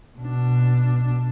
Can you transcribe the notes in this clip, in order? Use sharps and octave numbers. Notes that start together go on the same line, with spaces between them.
B2 D4